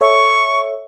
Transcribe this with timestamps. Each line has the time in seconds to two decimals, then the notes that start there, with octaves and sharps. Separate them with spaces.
0.01 A4 C#5 E5 C#6